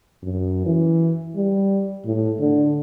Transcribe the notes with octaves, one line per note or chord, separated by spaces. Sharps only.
F#2
E3
G3
A2
D3